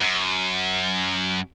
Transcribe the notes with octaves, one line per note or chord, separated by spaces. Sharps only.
F#2